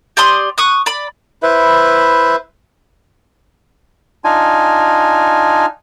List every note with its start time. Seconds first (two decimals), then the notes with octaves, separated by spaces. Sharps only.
0.17 G4 D5 C6 D#6
0.58 C#6 D#6 F#6
0.86 D5 B5
1.43 E4 B4 C5 E5
4.24 D4 D#4 F4 G#5